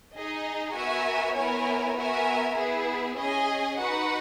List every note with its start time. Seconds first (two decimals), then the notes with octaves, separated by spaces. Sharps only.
0.13 D#4 G#4 D#5
0.74 B3 F#4 A#4 E5 G#5
1.35 B3 E4 A#4 C#5 G#5
1.96 B3 F#4 A#4 E5 G#5
2.56 B3 E4 G#4
3.17 C#4 G#4 D#5 G#5
3.78 D#4 F#4 B4 F#5